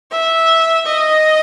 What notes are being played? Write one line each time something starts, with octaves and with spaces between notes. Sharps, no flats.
E5
D#5